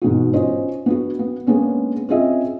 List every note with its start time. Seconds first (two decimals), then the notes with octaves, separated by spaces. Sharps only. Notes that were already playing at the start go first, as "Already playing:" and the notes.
0.02 G#2 B2 E3 F#4
0.34 C#4 F4 C5 D#5
0.86 B3 D4 F#4
1.19 B3
1.47 G#3 A#3 B3 C#4 D4
2.09 C4 C#4 F4 G#4 D#5 E5